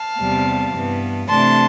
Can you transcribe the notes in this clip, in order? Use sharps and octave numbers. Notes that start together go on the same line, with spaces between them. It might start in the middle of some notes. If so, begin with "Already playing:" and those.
Already playing: F5 A5
E2 C3 G3 B3
G2 E3 B3
C3 E3 A3 D4 A5 C6